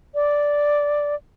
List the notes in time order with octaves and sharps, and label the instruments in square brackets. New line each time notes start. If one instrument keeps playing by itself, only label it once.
[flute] D5